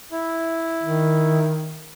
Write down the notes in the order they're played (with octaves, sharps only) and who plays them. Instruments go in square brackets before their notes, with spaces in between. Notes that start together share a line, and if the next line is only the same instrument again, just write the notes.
[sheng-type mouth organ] E4
[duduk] D#3